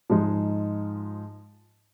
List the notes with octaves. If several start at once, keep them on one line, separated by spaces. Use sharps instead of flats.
G#2 F3 G#3 D#4